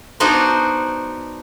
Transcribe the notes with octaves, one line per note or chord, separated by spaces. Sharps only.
B3 D4 D#4 F#4 C5